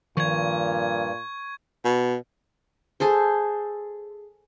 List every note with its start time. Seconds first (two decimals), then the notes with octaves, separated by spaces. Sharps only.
0.17 G2 A#2 D#3 F3 C#6 G#6
1.85 B2
3.00 G#4 A4 C5